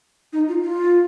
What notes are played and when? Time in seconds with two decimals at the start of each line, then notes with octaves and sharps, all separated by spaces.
0.33 D#4
0.48 F4
0.62 F4